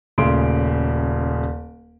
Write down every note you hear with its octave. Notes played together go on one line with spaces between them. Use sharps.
D#1 C#3 A3 C6 D7